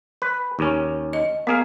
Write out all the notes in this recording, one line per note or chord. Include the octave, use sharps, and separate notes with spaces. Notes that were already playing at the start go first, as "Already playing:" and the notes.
B4
D#2 C#4
D#5
A#3 B3 G#4 F5